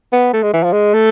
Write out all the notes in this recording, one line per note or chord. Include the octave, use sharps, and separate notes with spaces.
B3
A3
G#3
E3
F3
G#3
A3